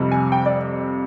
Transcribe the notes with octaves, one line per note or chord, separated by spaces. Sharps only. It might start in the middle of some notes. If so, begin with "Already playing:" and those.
Already playing: F2 C3 G3
G#5
G5
D5